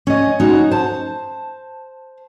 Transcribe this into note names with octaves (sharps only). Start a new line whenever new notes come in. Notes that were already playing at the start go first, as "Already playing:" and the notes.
C#4 D#5
C#4 D#4 F#4
C5 A5